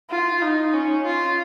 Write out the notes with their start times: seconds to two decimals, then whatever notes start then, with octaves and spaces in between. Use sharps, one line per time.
0.10 F4
0.42 D#4
0.73 C#4
1.05 F4